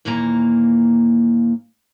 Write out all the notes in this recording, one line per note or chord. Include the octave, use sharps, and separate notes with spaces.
D#2 A#2 E3 A#3 A#5